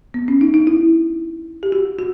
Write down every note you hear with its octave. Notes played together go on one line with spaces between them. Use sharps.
B3
C#4
D#4
D#4
E4
G4
F#4
F#4